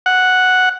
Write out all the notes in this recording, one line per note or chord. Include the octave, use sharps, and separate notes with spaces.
F#5